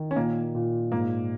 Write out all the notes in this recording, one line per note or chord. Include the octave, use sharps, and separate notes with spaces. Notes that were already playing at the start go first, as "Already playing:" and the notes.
Already playing: D#3
C#4
A#2 A#3
A#2
G#2 A#3